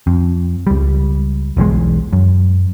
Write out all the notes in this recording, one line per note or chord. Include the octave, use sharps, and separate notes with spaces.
F2
C#2 G3
E1 B1 E2 G#3
F#2